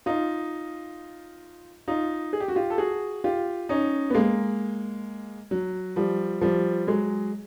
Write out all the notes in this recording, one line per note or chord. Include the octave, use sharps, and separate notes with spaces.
D#4 F4
D#4 F4
G#4
G4
F#4
F4 G4
A4
F#4 G#4
F4 G4
C#4 D#4
B3
G#3 A#3
F#3
F3 G3
F3 G3
F#3 G#3